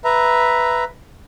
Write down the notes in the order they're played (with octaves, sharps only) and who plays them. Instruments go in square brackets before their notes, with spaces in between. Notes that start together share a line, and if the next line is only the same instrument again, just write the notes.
[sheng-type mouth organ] B4 E5 A#5